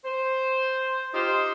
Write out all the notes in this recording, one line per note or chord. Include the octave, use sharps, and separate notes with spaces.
C5
D#4 F4 G4 C5